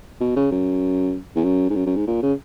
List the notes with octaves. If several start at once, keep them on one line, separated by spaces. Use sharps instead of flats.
B2
C#3
F#2
E2
F#2
G#2
F#2
F#2
G#2
A#2
C#3